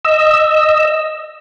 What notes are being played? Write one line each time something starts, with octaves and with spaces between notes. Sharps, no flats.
D#5 E6